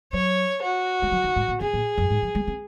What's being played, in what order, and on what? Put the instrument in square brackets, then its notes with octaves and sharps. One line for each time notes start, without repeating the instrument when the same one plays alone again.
[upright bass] F#3 [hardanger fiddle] C#5
[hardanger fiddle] F#4
[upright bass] G#3
F#3
D#3
G#2
A#2
[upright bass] C3 [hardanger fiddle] G#4
[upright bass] A#2
F#2
G#2
F3
G#3
C4